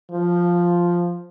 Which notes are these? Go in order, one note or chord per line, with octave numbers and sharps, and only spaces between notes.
F3